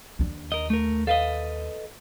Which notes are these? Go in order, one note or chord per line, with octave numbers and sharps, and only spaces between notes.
D#2 D4
A#4 D#5
A3 A#4
A4 B4 D#5 F5